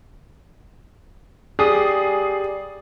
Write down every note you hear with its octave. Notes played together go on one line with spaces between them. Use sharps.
G4 G#4 D5 D#6